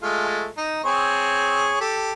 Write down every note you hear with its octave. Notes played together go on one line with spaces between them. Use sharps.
G#3 A3 F4
D#4
C4 G#4 C#5
G4 A4